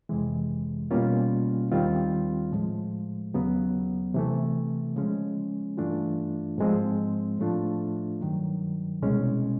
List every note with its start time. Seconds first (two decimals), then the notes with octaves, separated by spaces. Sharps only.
0.09 F2 C3 E3 G#3
0.91 B2 G3 A#3 C#4 F4
1.71 D#2 D#3 G3 C4 F4
2.52 A2 F3 G#3
3.34 D#2 C#3 F#3 B3
4.14 C3 E3 A3
4.96 C#3 F3 G#3 C#4
5.77 G2 E3 A3 D4 F4
6.58 G#2 F3 G#3 C4
7.39 A2 F3 A3 D4 F4
8.21 G2 D#3 F#3
9.02 C2 B2 G#3 C#4